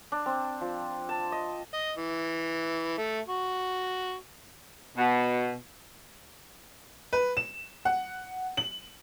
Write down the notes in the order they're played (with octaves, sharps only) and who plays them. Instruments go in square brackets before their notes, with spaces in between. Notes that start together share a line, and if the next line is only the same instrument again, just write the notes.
[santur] D4
C4
F3
A5
D#5
[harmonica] D#5
E3
A3
F#4
[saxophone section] B2
[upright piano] B4
E7
F#5
F#7